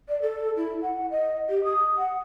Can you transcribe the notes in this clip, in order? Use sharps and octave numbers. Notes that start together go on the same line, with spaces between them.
D5
A4
E4
F#5
D#5
G4
D#6
F#5